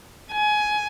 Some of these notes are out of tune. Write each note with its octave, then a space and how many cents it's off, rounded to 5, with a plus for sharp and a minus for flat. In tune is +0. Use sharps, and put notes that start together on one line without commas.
G#5 +20